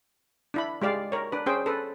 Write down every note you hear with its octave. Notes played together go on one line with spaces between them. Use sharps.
D4 E4 B5
G#3 G4 D5 F5
A#4 C#5
D4 B4
C#4 G#4 C5 G5
A4 B4